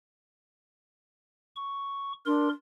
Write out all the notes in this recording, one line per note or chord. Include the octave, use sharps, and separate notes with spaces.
C#6
D4 A#4 C6